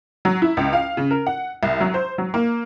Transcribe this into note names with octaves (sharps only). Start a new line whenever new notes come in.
F#3
E4
C#2
F5
C#3
A#4
F#5
C2
F#3
C5
F#3
A#3